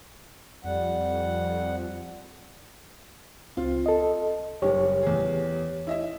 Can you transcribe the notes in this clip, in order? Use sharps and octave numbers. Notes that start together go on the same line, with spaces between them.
F2 G3 F#5
C#2 C4 F4
A4 D#5
F#1 G3 G4 C#5
E2 G#4
E4 D#5 E5